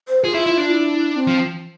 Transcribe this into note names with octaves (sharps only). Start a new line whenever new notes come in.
C5
F4 G#4
E4
E4
D4
E4
C4
F3